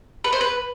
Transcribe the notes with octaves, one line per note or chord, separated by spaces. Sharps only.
B4
C5
B4